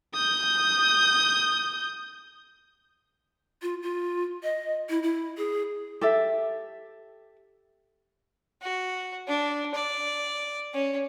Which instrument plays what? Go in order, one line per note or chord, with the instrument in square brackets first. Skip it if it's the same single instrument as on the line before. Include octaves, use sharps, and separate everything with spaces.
[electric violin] D#6 G6
[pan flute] F4
F4
D#5
E4
E4
G#4
[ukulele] G4 A4 E5
[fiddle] F#4
D4
D5
C#4